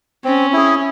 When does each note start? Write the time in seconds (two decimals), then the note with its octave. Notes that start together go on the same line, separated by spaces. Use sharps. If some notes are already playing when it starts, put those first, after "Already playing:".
0.24 C4 C#4
0.53 E4 G#4